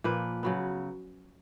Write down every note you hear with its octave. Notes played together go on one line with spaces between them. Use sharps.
A#2 F3 A#3 B4
C#3 F#3 B3